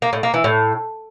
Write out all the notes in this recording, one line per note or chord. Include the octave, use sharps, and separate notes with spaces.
A#3
A2
A#3
E3
A2